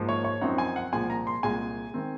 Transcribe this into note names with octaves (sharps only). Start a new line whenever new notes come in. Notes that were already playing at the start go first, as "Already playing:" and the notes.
Already playing: G#2 F3 A#3
C#5
C#5
F#2 F3 C4 D#4 F#5
G#5
F#5
C2 A#2 F3 G#3 G#5
A#5
C6
C2 A#2 G#3 G#5
D#3 G#3 C4